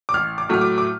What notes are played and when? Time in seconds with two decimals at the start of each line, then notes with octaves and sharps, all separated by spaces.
0.09 D6
0.14 A1 F6
0.38 D6
0.49 A2 F#3 A3 F6
0.61 D6
0.78 D6